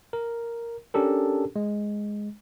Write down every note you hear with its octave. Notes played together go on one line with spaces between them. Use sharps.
A#4
C#4 D4 G4 A4 A#4
G#3